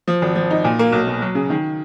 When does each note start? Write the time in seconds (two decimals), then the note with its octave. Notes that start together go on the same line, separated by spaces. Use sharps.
0.08 F3
0.22 G#1
0.36 F3
0.51 D#4
0.64 A#2
0.79 A#3
0.92 B1
1.07 B2
1.22 F#3
1.35 C#3
1.50 D#3